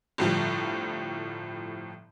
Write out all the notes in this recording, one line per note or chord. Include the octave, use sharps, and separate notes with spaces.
G1 A2 F3 G3